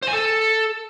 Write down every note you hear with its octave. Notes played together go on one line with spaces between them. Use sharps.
C5
G#5
A4